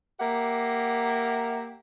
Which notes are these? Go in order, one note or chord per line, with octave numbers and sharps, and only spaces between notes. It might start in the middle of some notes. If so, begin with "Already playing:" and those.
A#3 G4 A#4 E5 F#5